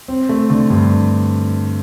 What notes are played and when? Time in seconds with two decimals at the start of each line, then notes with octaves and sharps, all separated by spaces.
0.08 C4
0.29 A3
0.50 D3
0.70 G2